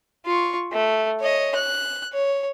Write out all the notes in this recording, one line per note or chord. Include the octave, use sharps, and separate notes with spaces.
F4 C#6
A3
C#5 D#5
F#6
C#5